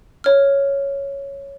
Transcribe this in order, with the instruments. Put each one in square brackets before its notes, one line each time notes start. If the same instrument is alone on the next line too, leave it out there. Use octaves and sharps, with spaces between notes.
[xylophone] C#5 F6